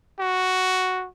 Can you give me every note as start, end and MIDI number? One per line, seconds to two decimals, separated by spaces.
0.19 1.07 66